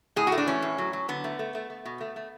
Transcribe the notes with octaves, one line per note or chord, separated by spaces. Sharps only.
A2 G#4
F#4
A3
D4
E3 C#4
A2
F#3
F#3
D3 B3
A3
A3
A3
A3
B2
A3
A3